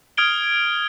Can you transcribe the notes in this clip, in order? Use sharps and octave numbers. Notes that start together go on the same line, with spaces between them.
D#6 F6 G#6 D7 G7